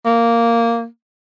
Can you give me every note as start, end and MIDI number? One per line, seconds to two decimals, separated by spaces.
0.06 0.86 58